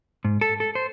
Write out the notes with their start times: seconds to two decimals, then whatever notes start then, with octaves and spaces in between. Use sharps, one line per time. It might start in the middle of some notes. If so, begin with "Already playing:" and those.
0.25 G#2
0.41 A4
0.60 A4
0.75 C5